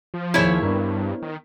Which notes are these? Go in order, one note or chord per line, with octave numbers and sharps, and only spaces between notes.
F3
D#2 E4 G#4 C5 C#5 B6
G2 B3 D4 A#4
D#3